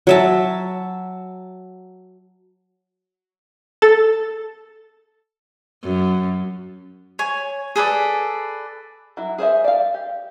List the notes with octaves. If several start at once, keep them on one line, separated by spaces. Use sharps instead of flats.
F#3 E5 A5
A4 A6
F#2
C#5 G#5
G#4 A4 B4 D5
F#3 E4
G#4 C5 C#5 E5
D5 F5
G4